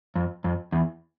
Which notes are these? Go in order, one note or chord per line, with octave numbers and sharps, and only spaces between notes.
F2
F2
E2